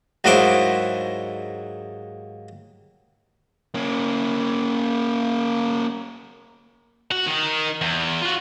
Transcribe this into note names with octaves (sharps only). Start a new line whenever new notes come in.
D#2 G#2 F#3 E4 C5 D6
A#3 C#4
F#4
D#3 D#4
E2
F4 F#4